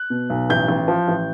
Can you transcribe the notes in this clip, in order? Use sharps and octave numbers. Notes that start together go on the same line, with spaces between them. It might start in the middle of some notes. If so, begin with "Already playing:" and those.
Already playing: F#6
B2
B1
A1 G6
A1
F3
A1